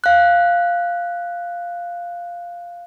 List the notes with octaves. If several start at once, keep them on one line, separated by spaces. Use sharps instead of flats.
F5 F#6